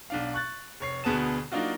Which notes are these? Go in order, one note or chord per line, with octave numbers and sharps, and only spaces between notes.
B1 D4 F5
C#6 F#6 A6
F1 C#5 C7
D2 B2 B3 G#4 A5 E7
F#3 A#3 D4 D#4 F4 F#4